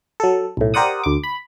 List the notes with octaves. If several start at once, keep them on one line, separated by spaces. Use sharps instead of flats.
F#3 A4
B1 A2
G4 A#4 C5 D5 F#5 D#6
D2 D6
B5